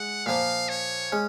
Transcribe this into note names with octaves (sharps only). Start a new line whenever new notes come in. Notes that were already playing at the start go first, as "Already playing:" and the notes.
Already playing: G#3 F#5
A#2 F3 A#3 F5
C#5
G#3 C#4